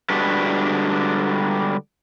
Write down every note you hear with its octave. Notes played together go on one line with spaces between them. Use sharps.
D3 G3 G#3 D4 F#4 B4